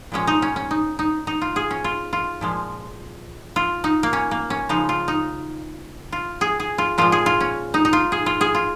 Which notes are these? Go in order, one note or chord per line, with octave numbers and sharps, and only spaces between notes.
A#2 F3 G#3 C#4
D#4
C#4
C#4
D#4
D#4
D#4
F4
G#4
C#4
F4
F4
A#2 F3 G#3
F4
D#4
A#3
C#4
A#3
C#4
C#3 F3 G#3 D#4
F4
D#4
F4
G#4
G#4
F4
A#2 F3 G#3 F4
G#4
F4
C#4
D#4
D#4
F4
G#4
F4
G#4
F4